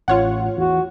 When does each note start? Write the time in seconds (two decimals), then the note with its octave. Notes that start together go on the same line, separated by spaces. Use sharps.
0.08 A1 F4 C#5 F#5
0.57 E2 F#4